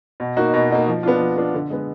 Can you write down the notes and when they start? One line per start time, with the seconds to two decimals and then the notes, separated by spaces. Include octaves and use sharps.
0.20 B2
0.37 A#3 D#4 F#4
0.54 B2
0.70 A#3 D#4 F#4
0.87 F3
1.03 B3 D4 F4
1.20 F3
1.37 B3 D4 F4
1.54 D3
1.70 G#3 B3